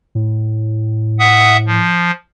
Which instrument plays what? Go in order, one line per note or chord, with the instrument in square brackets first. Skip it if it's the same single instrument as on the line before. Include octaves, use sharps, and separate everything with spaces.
[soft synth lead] A2
[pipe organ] E5 F#5 D#6
F3